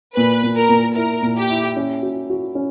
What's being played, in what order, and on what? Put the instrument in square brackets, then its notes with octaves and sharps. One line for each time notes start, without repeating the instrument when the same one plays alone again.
[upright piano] A#2 [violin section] B4
[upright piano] A#2
[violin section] A#4
[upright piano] A#2
[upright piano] E4 [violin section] A#4
[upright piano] A#2
[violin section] G4
[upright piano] E4
C#4
F#4
F#4
C#4